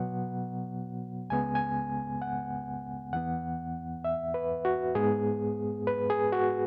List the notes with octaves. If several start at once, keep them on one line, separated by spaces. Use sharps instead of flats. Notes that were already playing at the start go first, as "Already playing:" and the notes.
Already playing: B2 F#3 B3 F#5
C#2 C#3 G#3 B3 G#5
G#5
F#5
E2 E3 B3 F#5
E5
B4
F#4
G#2 G#3 B3 G#4
B4
G#4
F#4